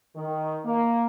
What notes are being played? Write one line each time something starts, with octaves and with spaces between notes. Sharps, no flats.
D#3
A#3